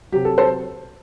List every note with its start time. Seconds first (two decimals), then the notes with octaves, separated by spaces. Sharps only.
0.12 C3 F#3 G4
0.25 A4
0.38 A4 C5